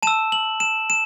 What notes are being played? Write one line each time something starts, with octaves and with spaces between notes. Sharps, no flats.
A5 E6 E7
F#7
E7
E7